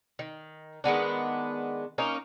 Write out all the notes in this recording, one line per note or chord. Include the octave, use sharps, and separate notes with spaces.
D#3
D#3 G#3 B3 D4
A#3 C#4 D#4